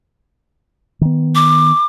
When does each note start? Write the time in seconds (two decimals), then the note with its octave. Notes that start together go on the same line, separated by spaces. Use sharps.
1.01 D#3 B3
1.35 D6